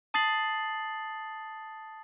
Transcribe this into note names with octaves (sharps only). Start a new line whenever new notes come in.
A5 D#6 A6 C7 F#7